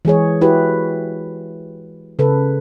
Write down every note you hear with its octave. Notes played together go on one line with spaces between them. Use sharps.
E3 G#3 G#4 C#5
E4 F#4 G4 B4
C#3 A4 B4